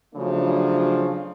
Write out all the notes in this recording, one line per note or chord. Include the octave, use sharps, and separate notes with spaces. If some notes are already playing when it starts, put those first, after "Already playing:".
C#3 F3 F#3 A3 D4